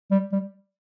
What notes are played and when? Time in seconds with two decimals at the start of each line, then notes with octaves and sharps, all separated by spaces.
0.11 G3
0.32 G3